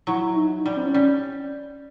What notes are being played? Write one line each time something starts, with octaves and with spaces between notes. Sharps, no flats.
F#3 E4
D#4
G3 D4
C4
C#4
G3